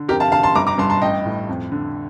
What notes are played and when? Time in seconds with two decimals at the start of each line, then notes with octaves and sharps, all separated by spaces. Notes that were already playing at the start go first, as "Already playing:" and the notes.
Already playing: D3
0.09 F2 G4 A#4
0.20 F5 A5
0.32 D3 F5 A5
0.43 A5 C6
0.55 G1 A#5 D6
0.67 A#5 D6
0.78 G2 A5 C6
0.90 A5 C6
1.02 A1 D#5 G5
1.25 A2
1.49 F2
1.72 D3